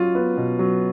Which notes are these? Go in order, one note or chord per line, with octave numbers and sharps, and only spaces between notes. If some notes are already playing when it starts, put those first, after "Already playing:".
Already playing: F#3 F4
B3
B2
F#3